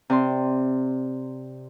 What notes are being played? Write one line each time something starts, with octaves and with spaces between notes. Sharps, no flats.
C3 D5 C6